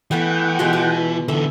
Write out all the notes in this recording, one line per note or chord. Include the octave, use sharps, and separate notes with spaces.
E3 A3 B3 B4 F#5 G5
B2 G#3 F4
B2
D3 E3 A4 E5